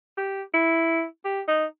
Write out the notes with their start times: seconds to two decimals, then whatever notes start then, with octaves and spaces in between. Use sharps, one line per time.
0.17 G4
0.54 E4
1.25 G4
1.48 D#4